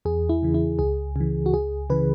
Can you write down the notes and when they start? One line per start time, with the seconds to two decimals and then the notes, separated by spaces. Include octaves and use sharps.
0.05 E2 G#4
0.29 E4
0.42 C#3 E3
0.54 E4
0.79 C#2 G#4
1.16 C#3 E3
1.46 F#4
1.54 C#2 G#4
1.90 C#3 E3 B4